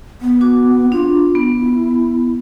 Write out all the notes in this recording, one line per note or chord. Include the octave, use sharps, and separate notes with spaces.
B3
F#4 D6
D4 F4
B3
E4